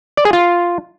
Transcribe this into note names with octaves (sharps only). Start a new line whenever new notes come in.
D5
G#4
F4